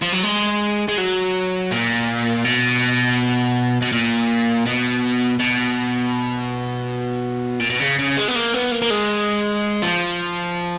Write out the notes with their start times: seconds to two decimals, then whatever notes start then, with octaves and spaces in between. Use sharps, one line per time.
0.02 F3
0.12 F#3
0.23 G#3
0.88 G#3
0.98 F#3
1.71 A#2
2.44 B2
3.82 B2
3.92 A#2
4.67 B2
5.39 B2
7.60 A#2
7.70 B2
7.80 C#3
7.99 C#3
8.17 G#3
8.28 B3
8.36 A#3
8.54 B3
8.71 A#3
8.82 A#3
8.90 G#3
9.82 F3